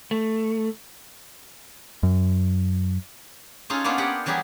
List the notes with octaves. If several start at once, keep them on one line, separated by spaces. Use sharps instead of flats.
A3
F#2
C#4 D#4 F4 G#4 A4
A#3 B3 C#4 D4 C5
G4 G#4 D5 F#5
E3 F#3 G3 G4 G#4